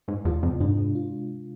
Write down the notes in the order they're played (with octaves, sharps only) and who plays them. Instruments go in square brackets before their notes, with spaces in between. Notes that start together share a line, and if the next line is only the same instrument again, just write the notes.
[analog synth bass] G#2 [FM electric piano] G#3
[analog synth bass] E2 [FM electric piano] F4
[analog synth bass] F2 [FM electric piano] C3
[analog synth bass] G#2 [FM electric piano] D4
[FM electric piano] G#3
F4